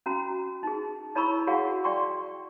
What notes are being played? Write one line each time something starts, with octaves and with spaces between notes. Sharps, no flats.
C#4 F#4 A#5
D#4 G#4
E4 C#5 A#5 B5 C#6 E6
F#4 G#4 C#5 F5 F#5 C#6
D5 G5 C6 C#6